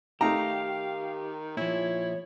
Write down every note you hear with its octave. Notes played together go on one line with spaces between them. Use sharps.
D#3 A3 D#4 G4 F5 A#5
A#2 F3 E4 C#5